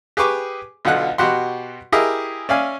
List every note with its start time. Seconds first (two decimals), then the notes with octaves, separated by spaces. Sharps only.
0.17 G4 G#4 B4 C#6 D6
0.85 B1 B2 D3 F4 F#5 F#6
1.18 B2 F#4 G4 F#5 C6
1.92 E4 G4 G#4 A#4 D#5 E5
2.49 C#4 D5 E5 F5 G#5